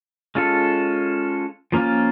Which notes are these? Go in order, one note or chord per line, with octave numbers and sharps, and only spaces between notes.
G#3 C#4 F4 A4
F3 A#3 C#4 F4